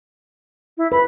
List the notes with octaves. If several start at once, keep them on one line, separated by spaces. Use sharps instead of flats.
E4
B4 B5